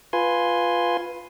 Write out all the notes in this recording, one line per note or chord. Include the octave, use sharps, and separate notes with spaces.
F4 B4 G#5 C6